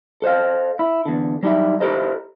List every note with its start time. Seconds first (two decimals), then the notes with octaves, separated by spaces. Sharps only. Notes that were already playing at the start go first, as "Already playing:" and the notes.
0.22 A4 C5 D#5 F5
0.79 E4
1.06 E2 D3
1.43 F#3 G3 D#4 E4 E5
1.80 E4 G4 A4 A#4 C5 D#5